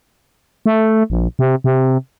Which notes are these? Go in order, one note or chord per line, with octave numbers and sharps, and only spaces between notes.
A3
A#1
C3
C3